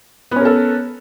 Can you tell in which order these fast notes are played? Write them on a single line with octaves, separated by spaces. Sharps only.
B3 C#4 A#4 A4